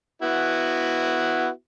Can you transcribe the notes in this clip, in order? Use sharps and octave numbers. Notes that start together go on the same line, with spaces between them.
B3 E4 F#4